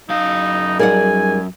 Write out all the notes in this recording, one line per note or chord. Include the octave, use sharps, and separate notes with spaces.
F#2 D#4 F5
G3 D#4 G#4 A#4 D5 F#5 G#5